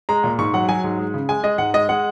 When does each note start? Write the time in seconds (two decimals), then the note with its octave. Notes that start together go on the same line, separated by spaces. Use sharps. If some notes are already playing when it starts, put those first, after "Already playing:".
0.09 G#3 A#5
0.24 A#2
0.38 G#2 C#6
0.54 F#3 F#5
0.69 F#3 G#5
0.84 G#2
0.99 G#3
1.14 C#3
1.29 G#3 G#5
1.44 G#3 D#5
1.58 G#2 F#5
1.74 G#3 D#5
1.89 G#3 F#5